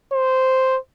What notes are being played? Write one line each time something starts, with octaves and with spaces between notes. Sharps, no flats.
C5